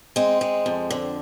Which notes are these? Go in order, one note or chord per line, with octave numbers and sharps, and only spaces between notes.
G#3 C4
G#3
F2
D3